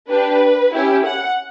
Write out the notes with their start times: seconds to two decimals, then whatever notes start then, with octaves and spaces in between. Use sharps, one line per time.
0.09 D4 G4 B4
0.73 C#4 E4 G4
1.04 F#5